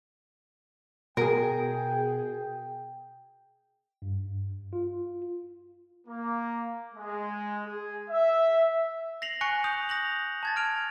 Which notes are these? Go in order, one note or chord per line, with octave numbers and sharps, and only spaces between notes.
B2 G#4 A#4 G5
G2
F4
A#3
G#3
G#4
E5
A#6 C7 F7 F#7
G#5 C#6 F#6 A#6 C#7
D#6 G6 F7
D#6 A#6 F7 F#7
A5 G#6 A6
F6 D7 F7